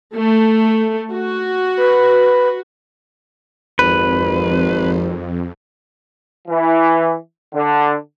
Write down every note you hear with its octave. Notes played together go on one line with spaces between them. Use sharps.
A3
F#4
B4
G#1 F2 B4
E3
D3